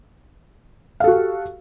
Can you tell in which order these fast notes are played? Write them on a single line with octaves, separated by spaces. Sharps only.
F5 A4 F#4 G4